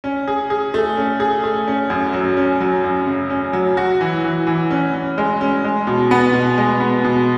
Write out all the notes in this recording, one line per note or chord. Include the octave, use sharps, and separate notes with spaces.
C#4
G#4
G#4
A3
C#4
G#4
A3
C#4
F#2
F#3
C#4
F#3
F#2
C#3
C#4
F#3
F#4
E3
E3
E3
C#4
C#4
G#3
C#4
G#3
B2
B3
B2
G#3
B3
B2